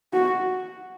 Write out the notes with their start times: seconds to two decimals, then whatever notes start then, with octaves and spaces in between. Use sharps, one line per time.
0.13 F#4